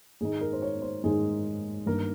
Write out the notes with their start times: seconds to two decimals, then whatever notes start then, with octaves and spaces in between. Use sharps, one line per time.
0.21 G#2 D#3 G#3 D#4 G#4
0.41 A#4
0.53 C5
0.62 C#5
0.82 C5
1.03 G#2 D#3 G#3 D#4 G#4
1.86 G2 D#3 A#3 A#4